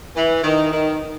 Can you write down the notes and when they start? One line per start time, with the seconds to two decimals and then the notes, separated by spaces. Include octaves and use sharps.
0.16 E3
0.44 D#3
0.72 D#3